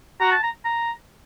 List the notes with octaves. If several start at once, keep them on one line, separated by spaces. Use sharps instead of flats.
F#4 A#5
A5
A#5
A#5